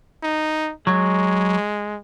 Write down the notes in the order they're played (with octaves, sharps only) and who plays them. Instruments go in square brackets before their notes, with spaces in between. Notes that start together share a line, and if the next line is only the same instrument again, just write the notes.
[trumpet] D#4
[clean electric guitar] F#3 [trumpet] G#3